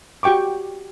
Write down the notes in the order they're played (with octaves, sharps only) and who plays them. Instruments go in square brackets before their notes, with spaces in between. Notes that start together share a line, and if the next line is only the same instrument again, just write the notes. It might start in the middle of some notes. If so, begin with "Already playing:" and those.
[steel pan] F#4 G4 G5 C#6 D6